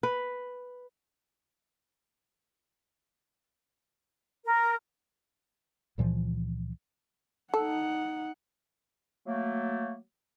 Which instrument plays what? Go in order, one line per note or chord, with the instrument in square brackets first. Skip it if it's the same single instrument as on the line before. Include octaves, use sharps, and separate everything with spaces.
[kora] B4
[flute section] A#4
[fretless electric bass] C#2 A#2 E3 F3
[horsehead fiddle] D#4 F#5 [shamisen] A4
[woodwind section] F#3 A3 A#3